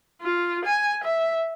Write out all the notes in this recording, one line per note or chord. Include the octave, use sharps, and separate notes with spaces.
F4
G#5
E5